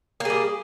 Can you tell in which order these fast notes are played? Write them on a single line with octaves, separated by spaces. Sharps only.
A#3 G#4 G3